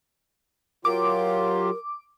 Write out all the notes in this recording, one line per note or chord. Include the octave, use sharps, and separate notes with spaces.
F#3 F4 G4 A#4 D6